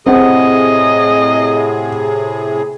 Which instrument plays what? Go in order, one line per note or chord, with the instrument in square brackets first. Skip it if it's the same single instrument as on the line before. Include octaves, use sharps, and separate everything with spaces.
[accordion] A2 C3 G#4 [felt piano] C4 F#5 [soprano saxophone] D#5